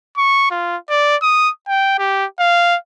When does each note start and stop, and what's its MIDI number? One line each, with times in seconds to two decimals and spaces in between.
0.17 0.50 85
0.51 0.77 65
0.90 1.16 74
1.21 1.50 87
1.68 1.97 79
1.98 2.26 67
2.39 2.76 77